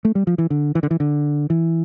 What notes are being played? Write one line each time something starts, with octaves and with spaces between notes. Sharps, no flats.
A3
G3
F3
E3
D3
E3
D3
E3
D3
E3